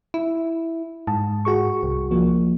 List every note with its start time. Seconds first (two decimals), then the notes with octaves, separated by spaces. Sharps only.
0.14 E4
1.07 G#2 A5
1.45 F#4 G#4 C#6
1.83 C2
2.11 F3 A#3